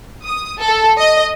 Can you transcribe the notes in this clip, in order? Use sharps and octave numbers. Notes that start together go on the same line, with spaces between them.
D#6
A4
D#5